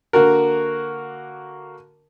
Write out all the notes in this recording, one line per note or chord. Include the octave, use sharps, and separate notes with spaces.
D3 A#3 F#4 A#4